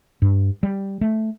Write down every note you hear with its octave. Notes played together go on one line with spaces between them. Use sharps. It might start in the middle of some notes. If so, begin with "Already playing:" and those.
G2
G3
A3